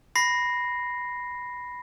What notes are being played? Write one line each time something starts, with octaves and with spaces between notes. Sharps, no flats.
B5 A#6 C7